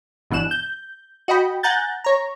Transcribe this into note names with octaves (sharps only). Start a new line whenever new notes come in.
G1 B2 E3 F#6 E7
G6
F#4 D#5 G5 B5
F#5 G#5 A#5 F#6 G6 A6
C#5 A#5